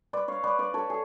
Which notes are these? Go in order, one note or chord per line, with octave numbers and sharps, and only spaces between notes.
B4 D5
C#5 F5
B4 D5
B4 D5
A4 C#5
G#4